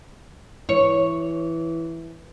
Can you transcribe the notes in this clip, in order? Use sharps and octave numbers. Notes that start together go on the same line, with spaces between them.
E3 C#5